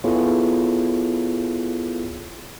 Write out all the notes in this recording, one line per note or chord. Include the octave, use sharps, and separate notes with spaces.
B3 E4 F4 G#4 A4 C#5